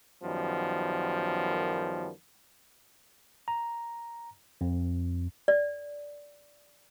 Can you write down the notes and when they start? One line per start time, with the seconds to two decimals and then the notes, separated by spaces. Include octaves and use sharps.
0.24 F#2 D#3 F3 G3 B3
3.48 A#5
4.61 F2
5.48 D5